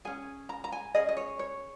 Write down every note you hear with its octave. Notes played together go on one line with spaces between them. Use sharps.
C#4 G#4 G#5
A#5
A#5
G#5
C#4 G#4 D#5
D#5
C#5
C#5